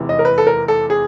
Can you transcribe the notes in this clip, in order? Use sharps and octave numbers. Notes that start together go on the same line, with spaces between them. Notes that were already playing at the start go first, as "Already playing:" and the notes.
Already playing: F1 E2 C3 E3
D#5
A#4
B4
A4
A#4
A4
G#4